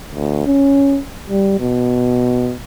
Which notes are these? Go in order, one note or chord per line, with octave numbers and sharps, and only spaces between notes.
D2
C#4
G3
B2